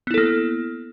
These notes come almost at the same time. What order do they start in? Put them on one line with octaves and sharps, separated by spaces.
B3 E4 A4 A#3